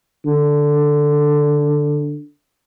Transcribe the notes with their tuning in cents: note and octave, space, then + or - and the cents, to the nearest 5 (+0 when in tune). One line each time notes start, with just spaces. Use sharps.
D3 +5